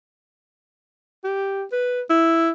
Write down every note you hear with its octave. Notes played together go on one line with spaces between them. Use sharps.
G4
B4
E4